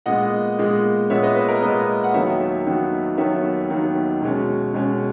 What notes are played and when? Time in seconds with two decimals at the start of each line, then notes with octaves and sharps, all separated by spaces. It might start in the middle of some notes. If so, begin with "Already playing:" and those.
0.06 A#2 G#3 B3 D#5 F#5
0.58 A#2 G#3 B3
1.10 A#2 G#3 B3 C#5 E5
1.22 B4 D#5
1.36 B4
1.48 A#4
1.62 A#2 G#3 B3 B4 D#5
2.04 F#5
2.14 D#2 D#3 F#3 B3 C#5 E5
2.66 D#2 D#3 F#3 B3
3.17 D#2 D#3 F#3 B3 C#5 E5
3.70 D#2 D#3 F#3 B3
4.22 B2 G#3 C#4
4.74 B2 G#3 C#4